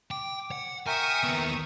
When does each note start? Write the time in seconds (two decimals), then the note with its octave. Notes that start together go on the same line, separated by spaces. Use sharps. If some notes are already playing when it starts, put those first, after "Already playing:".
0.11 G5 D6
0.51 F#5
0.87 A#4 E5 G5 G#5 C#6 D#6
1.23 D#2 B3